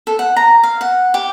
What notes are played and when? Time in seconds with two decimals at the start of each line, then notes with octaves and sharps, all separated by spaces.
0.07 A4
0.19 F#5
0.36 A#5
0.63 F5
0.81 F#5
1.14 G4